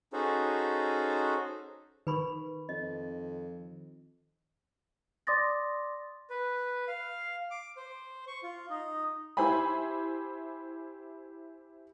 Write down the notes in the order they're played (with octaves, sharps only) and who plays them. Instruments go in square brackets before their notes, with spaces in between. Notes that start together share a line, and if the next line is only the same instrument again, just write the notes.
[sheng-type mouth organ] C#4 D#4 F#4 G#4 A4 C5
[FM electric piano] D#3 [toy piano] B4 B5 C#6
[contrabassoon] F2 [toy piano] D#5
[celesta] D5 C6 D6 D#6 A6 A#6
[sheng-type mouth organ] B4
F5
D6
C5
C#6
F4
D#4
[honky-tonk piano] E4 G4 C5 E5 G#5 B5